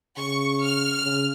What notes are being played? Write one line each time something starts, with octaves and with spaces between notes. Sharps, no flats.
C#3 C#6
F6
C#3